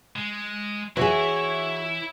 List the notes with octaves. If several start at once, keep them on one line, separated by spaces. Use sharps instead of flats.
G#3
E3 E4 F#4 G#4 C#5 E5